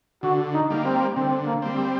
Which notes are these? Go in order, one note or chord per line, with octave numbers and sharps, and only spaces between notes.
D3 F#4
D#4
G3 A#3
C4
D3 C4
A#3
G3 C4